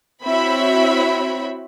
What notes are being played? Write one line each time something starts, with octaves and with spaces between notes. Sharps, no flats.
C4 E4 F#4 C#5 E5 B5